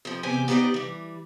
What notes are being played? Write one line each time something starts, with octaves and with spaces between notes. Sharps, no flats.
F2 F3
E2 C3 G4 G#5
B3 D#4 G4 A#4 D5 D#5
E3 G3